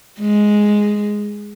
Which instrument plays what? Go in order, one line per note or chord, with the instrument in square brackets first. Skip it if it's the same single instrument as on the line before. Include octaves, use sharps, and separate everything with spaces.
[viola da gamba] G#3